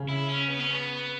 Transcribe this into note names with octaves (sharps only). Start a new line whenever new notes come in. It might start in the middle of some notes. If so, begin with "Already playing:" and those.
Already playing: C#3
E4
C#4
B3
C#4
B3